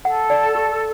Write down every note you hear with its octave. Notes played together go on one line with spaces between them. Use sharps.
A4 F#5
D5
G4